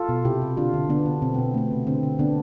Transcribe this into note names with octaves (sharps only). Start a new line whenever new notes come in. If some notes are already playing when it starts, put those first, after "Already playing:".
Already playing: F4 A4
B2
C3 E4 G4
C3
D3 D4 F4
D3
D3 B3 D4
D3
B2 C4
B2 B3
A3 B3
C3
D3 C4
D3
D3 B3 D4